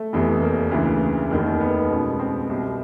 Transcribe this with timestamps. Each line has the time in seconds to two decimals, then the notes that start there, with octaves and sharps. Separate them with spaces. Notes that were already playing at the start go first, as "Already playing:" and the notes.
Already playing: A3
0.13 F1 E2 C3 E3
0.42 A#3
0.71 D2 C#3 E3
1.30 F1 D#2 D#3
1.60 B3
1.90 C#2 B2
2.19 C4
2.49 C2 B2